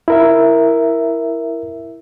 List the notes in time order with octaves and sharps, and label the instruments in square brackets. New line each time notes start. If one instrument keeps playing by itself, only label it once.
[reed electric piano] E4 A#4 E5